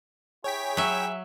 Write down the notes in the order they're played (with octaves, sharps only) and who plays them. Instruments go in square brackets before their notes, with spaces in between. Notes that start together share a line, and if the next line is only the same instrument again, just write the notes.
[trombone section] E4 G4 G#4 [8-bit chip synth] C#5 G5 B6
[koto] F#3 E5